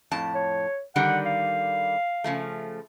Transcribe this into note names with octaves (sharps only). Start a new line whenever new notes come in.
F2 A2 A5
C#5
D3 D#3 G3 F#5
F5
C#3 F3 A3